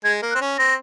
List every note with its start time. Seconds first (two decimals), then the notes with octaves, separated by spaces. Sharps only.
0.04 G#3 G#6
0.22 A#3
0.31 F#6
0.35 C4
0.41 C#4
0.58 C4 A#6